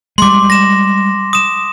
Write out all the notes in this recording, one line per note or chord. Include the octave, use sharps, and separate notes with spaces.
G3 G#3 C6 D6
A#6 E7
D#6 E7